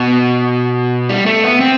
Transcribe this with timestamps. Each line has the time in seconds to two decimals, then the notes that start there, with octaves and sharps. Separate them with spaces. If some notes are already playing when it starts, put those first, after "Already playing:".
Already playing: B2
1.09 G3
1.26 A3
1.44 B3
1.61 C4